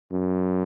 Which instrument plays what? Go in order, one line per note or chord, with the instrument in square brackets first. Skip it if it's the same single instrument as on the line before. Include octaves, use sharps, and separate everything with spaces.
[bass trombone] F#2